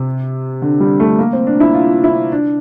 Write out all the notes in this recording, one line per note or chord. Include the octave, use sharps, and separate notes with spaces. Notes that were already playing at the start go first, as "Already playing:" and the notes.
Already playing: C3
D3
G3
A3
A#3
C4
D4
E4
F4
E4
D4